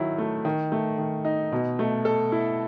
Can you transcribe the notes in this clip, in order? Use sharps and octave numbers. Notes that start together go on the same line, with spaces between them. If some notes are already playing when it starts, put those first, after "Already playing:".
Already playing: D#3 F#3 E4
A3
D#3
A3
D#3
D#4
B2
A3
A4
E4